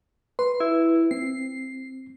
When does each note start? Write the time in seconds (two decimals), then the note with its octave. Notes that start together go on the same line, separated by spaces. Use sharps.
0.39 B4 C6
0.60 E4
1.11 C4 C7